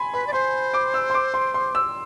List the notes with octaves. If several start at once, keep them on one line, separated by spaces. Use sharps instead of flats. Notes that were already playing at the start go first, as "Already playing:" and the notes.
Already playing: G#5 B5 C6
B4 B5
D5
C5 C6
D6
E6
C6
D6
C6
C6
E6